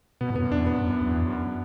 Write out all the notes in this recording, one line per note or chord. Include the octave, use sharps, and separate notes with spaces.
B2 B3
A2
F#2 B3
E2 D4
F#2 B3
F#2
E2
F#2